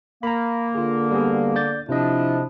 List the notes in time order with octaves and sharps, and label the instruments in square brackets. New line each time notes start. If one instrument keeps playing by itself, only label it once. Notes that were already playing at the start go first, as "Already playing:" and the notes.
[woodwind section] A#3 [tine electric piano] A#5 B5
[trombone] D3 [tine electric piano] F4 G#4
[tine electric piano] G3 B3 G#4
D5 G6 A6
[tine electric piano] C3 D#5 [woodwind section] F3 D4 [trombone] E4